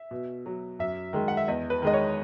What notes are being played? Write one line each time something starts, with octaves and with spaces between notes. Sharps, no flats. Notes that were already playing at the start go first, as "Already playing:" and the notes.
Already playing: E5
B2
F#3
F#2 E5
D#3 G#3
F#5
E5
E2 D#5
B4
D#3 G#3 D#5
C#5